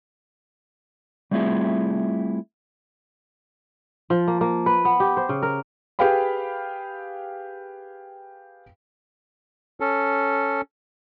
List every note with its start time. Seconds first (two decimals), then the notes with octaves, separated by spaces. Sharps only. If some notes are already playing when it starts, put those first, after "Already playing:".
1.31 G3 A3 C4 E4 F4 G#4
4.10 F3
4.28 A#3
4.41 A#3
4.66 B4
4.85 B3
5.00 G4
5.17 C5
5.29 C#3
5.43 A#4
5.99 G4 G#4 B4 F5 G5 B5
9.80 C#4 A4